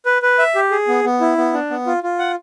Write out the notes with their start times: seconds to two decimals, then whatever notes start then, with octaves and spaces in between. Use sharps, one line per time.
0.06 B4
0.22 B4
0.39 E5
0.55 G4
0.71 G#4
0.88 B3
1.04 B3
1.21 E4
1.38 B3
1.53 D4
1.71 B3
1.86 F4
2.03 F4
2.19 F#5